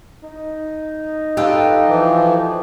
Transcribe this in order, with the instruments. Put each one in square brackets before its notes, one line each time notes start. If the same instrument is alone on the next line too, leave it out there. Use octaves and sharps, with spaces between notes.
[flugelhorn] D#4
[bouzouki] F4 A4 B4 [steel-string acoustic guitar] G4
[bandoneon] E3 F3